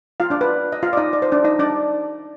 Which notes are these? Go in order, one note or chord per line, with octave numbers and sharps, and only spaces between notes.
F4 F5
D4 D5
B4
D#5
F4 F5
D5
D#4 D#5
D5
C5
D4 D5
D#4 D#5
D4 D5